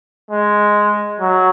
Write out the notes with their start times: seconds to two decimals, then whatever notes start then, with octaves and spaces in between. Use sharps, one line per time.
0.31 G#3
1.20 F#3